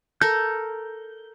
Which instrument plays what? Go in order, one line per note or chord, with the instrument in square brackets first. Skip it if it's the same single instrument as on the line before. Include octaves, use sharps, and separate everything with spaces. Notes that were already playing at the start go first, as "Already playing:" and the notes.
[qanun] A4 A#4 [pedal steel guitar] G6